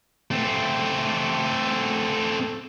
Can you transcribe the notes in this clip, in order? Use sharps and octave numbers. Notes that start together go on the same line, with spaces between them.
A3 C4